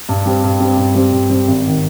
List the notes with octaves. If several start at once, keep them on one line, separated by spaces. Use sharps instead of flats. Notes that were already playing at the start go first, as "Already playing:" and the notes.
G2
G3 C4
G2
G3 C4
G2
G3 C4
G2
G3 C4
G#1
D#3